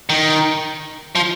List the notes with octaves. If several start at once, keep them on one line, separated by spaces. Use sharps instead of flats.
D#3
F3